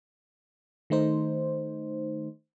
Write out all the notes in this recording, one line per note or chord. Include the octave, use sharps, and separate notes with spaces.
D#3 A3 D#4 C5